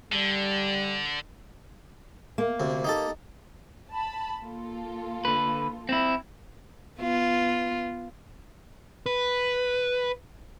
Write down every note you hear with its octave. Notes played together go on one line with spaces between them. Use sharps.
D3 G3
A#3
D2 C3
D#4 G4 A4
A5 B5
A#3 F4 A4
D3 B4
C4 E4
B3 F4
B4